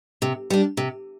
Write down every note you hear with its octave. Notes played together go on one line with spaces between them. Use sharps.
C3
G3 D4
C3